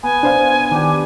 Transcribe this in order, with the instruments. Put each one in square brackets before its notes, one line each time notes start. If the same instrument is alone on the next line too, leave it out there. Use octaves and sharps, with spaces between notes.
[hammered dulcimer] B3 [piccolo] G#5
[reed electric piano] D4 C5 F5
[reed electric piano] D#3 [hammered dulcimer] D4 G4